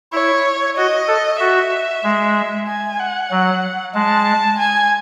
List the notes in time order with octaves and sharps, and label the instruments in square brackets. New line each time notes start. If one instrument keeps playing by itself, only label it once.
[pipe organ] E4 [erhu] C#5
[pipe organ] F#4 [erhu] D#5
[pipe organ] A4
[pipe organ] F#4 [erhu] E5
[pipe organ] G#3
[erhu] G#5
F#5
[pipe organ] F#3
[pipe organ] G#3 [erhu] A5
[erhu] G#5